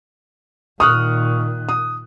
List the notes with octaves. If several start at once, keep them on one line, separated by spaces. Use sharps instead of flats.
A#2 D#3 C#6 D#6 F6 F#6
D#6